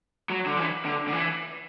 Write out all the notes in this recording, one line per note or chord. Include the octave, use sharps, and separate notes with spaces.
F#3
D3
E3
D3
D3
E3